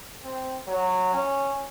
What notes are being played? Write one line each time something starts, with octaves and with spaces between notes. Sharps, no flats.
C4
F#3
C#4